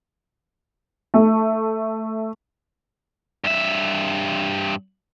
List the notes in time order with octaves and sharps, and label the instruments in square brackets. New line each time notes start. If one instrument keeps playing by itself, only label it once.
[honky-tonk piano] A3
[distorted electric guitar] G2 E5